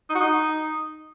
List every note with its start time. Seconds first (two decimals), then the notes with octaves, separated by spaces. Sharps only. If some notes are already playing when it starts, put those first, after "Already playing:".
0.10 D#4
0.15 F#4
0.21 D#4